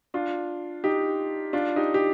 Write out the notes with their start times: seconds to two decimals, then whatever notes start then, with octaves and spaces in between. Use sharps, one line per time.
0.14 D4 F4
0.84 D#4 G4
1.53 D4 F4
1.76 D#4 G4
1.94 G4